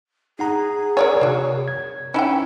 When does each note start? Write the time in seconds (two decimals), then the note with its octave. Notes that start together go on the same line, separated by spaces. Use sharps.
0.39 D#4 G#4 F#5 A#5
0.97 A#4 C#5 D5 G#5
1.21 C3 A#3 F#4
1.68 G#6
2.14 C#4 D#4 E4 G5 B5